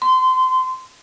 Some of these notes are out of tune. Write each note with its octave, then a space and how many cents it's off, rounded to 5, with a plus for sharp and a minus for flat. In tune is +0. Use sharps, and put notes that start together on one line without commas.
C6 -25